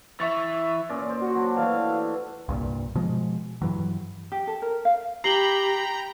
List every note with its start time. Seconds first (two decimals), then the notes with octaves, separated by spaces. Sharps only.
0.20 E3 E5 C#6 A6
0.89 A#2 C#4 D5
1.09 C5
1.21 F#4
1.35 F#3 D4
1.56 E3 A3 F5
2.49 C2 G2 A#2
2.95 B2 F3 G#3
3.62 G2 E3 F#3
4.32 G4
4.47 A4
4.62 A#4
4.85 F5
5.24 G4 G5 A#5 B5 C7 F#7 G7